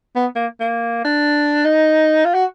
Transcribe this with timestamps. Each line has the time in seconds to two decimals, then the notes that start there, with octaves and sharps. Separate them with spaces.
0.16 B3
0.36 A#3
0.60 A#3
1.05 D4
1.65 D#4
2.25 F4
2.34 F#4